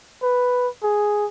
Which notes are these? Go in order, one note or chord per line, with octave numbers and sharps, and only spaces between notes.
B4
G#4